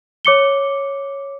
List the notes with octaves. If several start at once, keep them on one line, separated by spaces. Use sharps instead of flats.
C#5 D6 C#7 G7